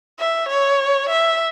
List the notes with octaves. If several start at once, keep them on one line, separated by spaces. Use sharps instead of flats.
E5
C#5
E5